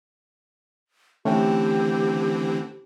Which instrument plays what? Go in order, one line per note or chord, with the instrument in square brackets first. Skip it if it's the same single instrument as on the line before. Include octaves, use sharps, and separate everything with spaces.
[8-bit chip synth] D3 E3 C4 [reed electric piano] A3 C#4 G5 [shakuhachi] G4